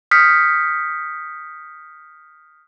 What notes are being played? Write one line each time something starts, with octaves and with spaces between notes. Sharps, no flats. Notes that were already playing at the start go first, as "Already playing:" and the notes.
D#6 F6 G6 B6 C#7